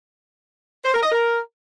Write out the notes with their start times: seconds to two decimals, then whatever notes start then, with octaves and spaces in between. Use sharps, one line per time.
0.85 C5
0.94 A#4
1.03 D#5
1.12 A#4